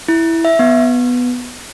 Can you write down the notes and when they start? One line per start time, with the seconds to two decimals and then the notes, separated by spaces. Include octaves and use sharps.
0.08 E4
0.45 E5
0.59 B3